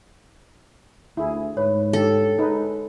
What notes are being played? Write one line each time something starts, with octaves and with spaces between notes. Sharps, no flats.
D2 E4 G#4
G#2 B4 C#5
D3 G4 A4
G#3 D#4 B4